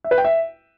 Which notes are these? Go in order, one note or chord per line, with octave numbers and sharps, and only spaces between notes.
E5
B4
G5
E5